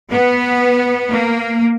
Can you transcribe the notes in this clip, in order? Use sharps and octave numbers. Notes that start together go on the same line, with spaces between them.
B3
A#3